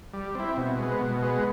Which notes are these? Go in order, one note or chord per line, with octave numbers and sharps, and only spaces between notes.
G3
C4 E4
B2
G#3 B3
B2
G#3 B3